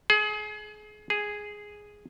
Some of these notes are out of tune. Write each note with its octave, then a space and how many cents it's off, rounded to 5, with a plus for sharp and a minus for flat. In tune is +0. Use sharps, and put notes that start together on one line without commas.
G#4 +30
G#4 +0